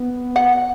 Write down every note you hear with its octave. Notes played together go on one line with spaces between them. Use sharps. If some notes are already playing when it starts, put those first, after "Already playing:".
Already playing: B3
F#5